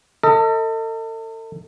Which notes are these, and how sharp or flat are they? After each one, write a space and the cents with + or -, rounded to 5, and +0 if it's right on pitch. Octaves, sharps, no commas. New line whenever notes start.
A4 +40 D#5 +25